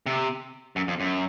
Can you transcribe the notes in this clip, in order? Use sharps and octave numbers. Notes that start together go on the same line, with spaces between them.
C3
F#2
F2
F#2